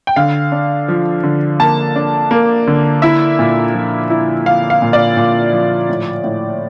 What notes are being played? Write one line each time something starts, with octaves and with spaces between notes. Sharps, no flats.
G5
D3 F5
D4
F3
D3
A#3 A5
D4
A#3
D3
E4 E5
A#2
F3
E4
F3 F5
F5
A#2
D5
A#2
F3
A2
A2